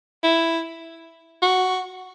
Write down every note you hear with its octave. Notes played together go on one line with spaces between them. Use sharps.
E4
F#4